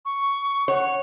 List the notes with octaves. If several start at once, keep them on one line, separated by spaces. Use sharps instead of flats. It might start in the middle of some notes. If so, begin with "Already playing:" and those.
C#6
C#5 F#5